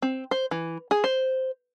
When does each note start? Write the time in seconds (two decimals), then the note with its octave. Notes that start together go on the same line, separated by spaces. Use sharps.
0.02 C4
0.31 C5
0.51 E3
0.91 G#4
1.04 C5